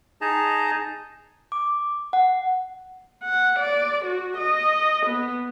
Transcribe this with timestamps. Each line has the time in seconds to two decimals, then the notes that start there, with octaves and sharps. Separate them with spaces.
0.21 D#4 G#4 D#5 A5 A#5
1.52 D6
2.13 F#5
3.24 F#5
3.60 D5
4.05 F#4
4.37 D#5
5.06 B3